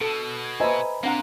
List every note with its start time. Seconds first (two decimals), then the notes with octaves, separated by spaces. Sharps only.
0.01 B2 A4
0.44 G#6
0.60 B4 C5 D#5 E5 G#5 A#5 B5
1.03 A#3 C4 D4 F4 F5 F#5 A#5